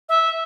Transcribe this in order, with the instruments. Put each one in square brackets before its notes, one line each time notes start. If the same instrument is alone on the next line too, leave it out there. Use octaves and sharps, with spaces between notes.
[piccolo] E5